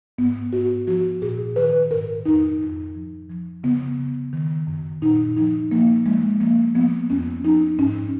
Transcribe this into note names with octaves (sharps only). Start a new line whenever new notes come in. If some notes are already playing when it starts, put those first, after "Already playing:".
G#2 B3
G#2 F#4
F3 F#4
A#2 G#4
D#3 B4
G#2 A#4
F2 D#4
F2
F3
F3
C#3 B3
C#3
D#3
F#2
A#2 D#4
F3 D#4
F3 A#3
F3 G#3
F3 A#3
F3 B3
F2 C#4
F3 D#4
G#2 C#4